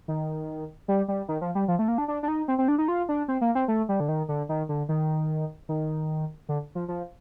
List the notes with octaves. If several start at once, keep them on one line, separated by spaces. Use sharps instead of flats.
D#3
G3
G3
D#3
F3
G3
F3
A3
A#3
D4
D4
D4
D#4
C4
C4
D4
D#4
F4
D4
C4
A#3
C4
A3
G3
D3
D#3
D3
D#3
D3
D#3
D#3
D3
F3
F3